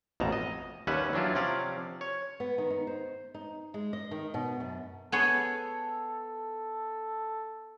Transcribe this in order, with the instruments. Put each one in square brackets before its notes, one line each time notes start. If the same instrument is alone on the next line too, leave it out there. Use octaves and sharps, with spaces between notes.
[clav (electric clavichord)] A1 F2 B2 A5 A#5
D#5
D#2 G3 C#4 B4 E5 F#5
E3 F#3 D4 E4 F4
C3 F3 C#4 D5 F5
C#5
[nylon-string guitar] B3
D#3
D#4
C5
D#4
G#3
D#5
D#3
B2
F#2
[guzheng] B3 G#4 C#5 [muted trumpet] A4